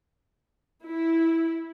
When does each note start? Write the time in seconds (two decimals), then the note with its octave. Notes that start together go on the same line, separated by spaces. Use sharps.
0.84 E4